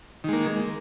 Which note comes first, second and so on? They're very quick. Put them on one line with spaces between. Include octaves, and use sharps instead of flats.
D#3 G#3 A#3